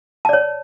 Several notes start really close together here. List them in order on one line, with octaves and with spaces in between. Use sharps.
A5 D5 C#5